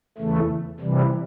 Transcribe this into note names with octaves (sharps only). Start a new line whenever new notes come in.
E2 C#3 E3 A3
C3 E3 G3